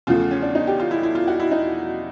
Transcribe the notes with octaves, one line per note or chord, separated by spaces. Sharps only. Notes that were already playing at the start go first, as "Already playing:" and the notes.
E2 C#3 F3 A3 F4
C#4
D4
D#4
G4
F4
E4
E4
F4
F#4
E4
D#4